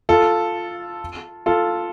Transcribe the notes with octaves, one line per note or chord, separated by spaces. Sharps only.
F4 A4
F4 A4